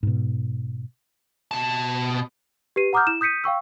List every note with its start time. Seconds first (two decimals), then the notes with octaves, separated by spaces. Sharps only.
0.03 G#2 B2
1.51 B2 A5
2.76 G4 B4 C7 D#7
2.93 F#5 A#5 D6 D#6 F6 G6
3.07 E4 E7
3.21 D#6 G6 B6 C#7 D#7
3.44 F5 G5 C#6 E6